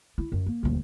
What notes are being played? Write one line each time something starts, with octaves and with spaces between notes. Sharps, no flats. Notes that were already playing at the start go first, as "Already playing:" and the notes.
E4
F#2
A#3
D#1 D2